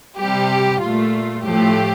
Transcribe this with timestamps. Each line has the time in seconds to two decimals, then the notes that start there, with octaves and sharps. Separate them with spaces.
0.18 C3 G3 G4
0.81 A#2 A3 F4
1.45 A2 F3 A3 G4